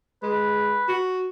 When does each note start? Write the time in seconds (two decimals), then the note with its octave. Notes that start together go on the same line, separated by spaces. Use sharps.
0.23 G#3 B4
0.89 F#4